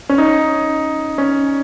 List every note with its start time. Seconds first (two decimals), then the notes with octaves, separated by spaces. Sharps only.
0.09 C#4
0.18 D#4
1.18 C#4